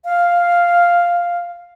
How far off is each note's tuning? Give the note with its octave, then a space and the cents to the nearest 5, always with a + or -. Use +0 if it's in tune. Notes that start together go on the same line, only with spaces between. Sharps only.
F5 +0